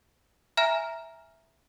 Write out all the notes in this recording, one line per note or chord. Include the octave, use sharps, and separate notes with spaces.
E5 G#5 A#5 F6